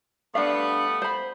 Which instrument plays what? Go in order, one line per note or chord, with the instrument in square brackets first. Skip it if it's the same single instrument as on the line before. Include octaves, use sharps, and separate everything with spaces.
[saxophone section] G3 A3 B3 [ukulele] D4 F5
[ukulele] C5 B5